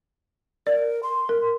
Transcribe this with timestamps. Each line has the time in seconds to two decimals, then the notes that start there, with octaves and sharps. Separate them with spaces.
0.67 A#4 D5
1.03 C6
1.29 A#4